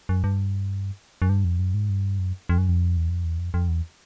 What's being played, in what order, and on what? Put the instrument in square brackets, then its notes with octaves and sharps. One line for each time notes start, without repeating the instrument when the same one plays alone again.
[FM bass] F#2
G2
F#2
G2
F2
F#2
G#2
G2
F#2
F2
F#2
F2
E2
F2
E2
F2
F2
E2